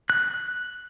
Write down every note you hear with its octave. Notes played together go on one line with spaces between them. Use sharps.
F#6